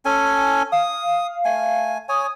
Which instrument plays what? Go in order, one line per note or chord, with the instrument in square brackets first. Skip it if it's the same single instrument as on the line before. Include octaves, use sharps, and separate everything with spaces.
[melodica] C#4 A4 G#5
[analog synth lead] F5 [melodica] D#6
[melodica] A3 G#5
[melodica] C#5 G#5 [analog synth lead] D#6